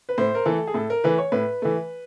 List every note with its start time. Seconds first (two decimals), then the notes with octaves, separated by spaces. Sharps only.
0.09 B4
0.18 A2 C5
0.35 A#4
0.45 E3 A3 A4
0.67 G#4
0.74 A2 A4
0.90 A#4
1.04 E3 A3 B4
1.18 C#5
1.32 A2 B4
1.62 E3 A3